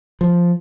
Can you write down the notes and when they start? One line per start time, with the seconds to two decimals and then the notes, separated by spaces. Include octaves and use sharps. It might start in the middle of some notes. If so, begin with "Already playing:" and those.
0.21 F3